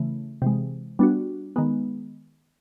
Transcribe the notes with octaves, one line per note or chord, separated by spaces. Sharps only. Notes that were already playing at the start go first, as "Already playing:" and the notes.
Already playing: C#3 E3 A3
C3 E3 G#3
G3 B3 D4 F#4
D#3 G#3 B3